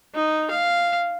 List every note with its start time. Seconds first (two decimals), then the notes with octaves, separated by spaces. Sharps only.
0.15 D#4
0.51 F5